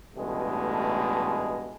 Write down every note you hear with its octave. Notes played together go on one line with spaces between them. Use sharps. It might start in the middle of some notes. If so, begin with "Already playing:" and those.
A1 G2 B2 G#3 A3